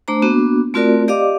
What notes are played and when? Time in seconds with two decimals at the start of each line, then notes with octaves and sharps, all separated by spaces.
0.08 A3 D4 C5 A#5
0.22 A#3 B3 D4 F#4
0.74 A3 C4 F4 F#4 A#4 D5
1.08 G4 D5 D#5 F5 D6